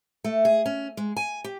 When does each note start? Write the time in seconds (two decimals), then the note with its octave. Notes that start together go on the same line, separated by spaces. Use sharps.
0.24 A3
0.45 G#4
0.66 C#4
0.97 G#3
1.17 G#5
1.44 G4